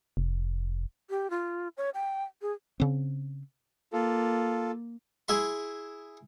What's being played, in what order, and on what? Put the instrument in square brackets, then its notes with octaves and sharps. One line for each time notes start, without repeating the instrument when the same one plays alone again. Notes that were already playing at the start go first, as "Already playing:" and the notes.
[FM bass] F1
[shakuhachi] G4
F4
C#5
G5
G#4
[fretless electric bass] C#3 C4
[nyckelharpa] A#3 [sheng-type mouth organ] F4 A4
[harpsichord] E4 G#4 E5 C6